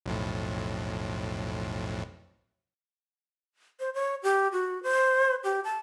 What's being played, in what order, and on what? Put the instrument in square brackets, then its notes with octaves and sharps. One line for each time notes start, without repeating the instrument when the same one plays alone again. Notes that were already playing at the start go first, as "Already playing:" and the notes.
[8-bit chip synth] B1 F2 A2
[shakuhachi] C5
C#5
G4
F#4
C5
G4
A5